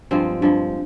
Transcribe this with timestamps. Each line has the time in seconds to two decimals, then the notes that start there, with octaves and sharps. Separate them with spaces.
0.11 G2 F3 G#3 C4
0.42 G2 F3 G#3